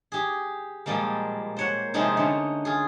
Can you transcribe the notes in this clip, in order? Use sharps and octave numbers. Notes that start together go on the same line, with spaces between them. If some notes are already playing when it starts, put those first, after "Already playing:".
G4 G#4
A#2 F3 G3 G#3 A#3
C5 C#5 F#5
C3 F3 G#3 C4 D#4 E4
D3 A3 C#4 D#4
F4 G#4